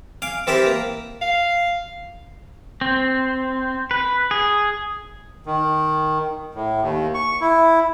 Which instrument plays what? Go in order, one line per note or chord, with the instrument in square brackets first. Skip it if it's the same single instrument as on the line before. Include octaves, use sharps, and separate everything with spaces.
[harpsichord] F5 G#5 D6
E3 C4 G4 A4 A#4 E5
A#3
[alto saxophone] F5
[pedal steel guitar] C4
B4
G#4
[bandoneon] D#3
A2
D#2
C#6
E4